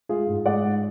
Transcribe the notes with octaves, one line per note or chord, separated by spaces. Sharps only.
G#3 F4 G#4
G#2
G#3 D5 F#5
G#2